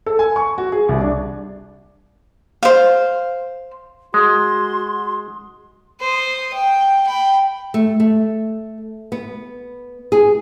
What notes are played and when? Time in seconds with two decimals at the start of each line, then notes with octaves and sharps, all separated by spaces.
0.06 A4
0.19 G#5
0.36 C#6
0.58 F#4
0.72 G#4
0.89 C2
1.01 D4
2.63 C5 F5
4.14 G#3 F#4 C6
6.00 C5 D#6
6.53 G5
7.07 G5 B5
7.74 A3
8.00 A3
9.12 B3
10.12 G#4